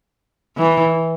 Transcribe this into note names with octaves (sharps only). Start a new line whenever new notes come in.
E3